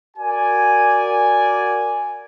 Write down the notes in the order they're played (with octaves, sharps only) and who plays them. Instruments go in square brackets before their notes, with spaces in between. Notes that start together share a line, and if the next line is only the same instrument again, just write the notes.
[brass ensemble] F#4 A#4 D5 G#5